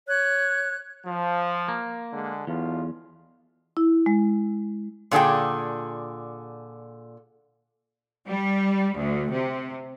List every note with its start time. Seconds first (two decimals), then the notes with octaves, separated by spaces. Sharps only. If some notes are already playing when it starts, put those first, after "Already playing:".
0.07 C#5 F#6
1.06 F3
1.68 A#3
2.13 D3 G#3
2.47 B1 E2 B2 F4
3.77 E4
4.06 G#3
5.11 A#2 D3 G#4 A4 G5
8.27 G3
8.97 D2
9.31 C3